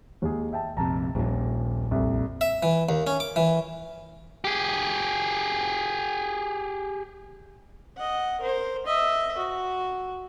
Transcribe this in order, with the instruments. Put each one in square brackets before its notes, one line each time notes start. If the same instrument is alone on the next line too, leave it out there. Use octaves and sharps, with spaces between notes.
[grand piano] D#2 G#3 G#4
E5 G5 A5
[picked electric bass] A#1 F2 C3 [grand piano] A5 A#5
[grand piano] D#1 [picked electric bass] A#1 D#2 A#2
[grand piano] C2 F2
[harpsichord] E5
E3
D#2
C#4
D6
E3
[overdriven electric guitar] G4 G#4
[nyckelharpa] D#5 F#5
A#4 C5
D#5 E5
F#4